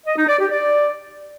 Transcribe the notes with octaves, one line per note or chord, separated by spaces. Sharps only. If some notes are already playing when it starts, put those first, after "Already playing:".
D#5
D#4
D5
G4
D5